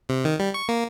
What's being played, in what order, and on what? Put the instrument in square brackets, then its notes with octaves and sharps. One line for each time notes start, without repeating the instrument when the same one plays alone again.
[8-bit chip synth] C3
D#3
G3
C#6
A#3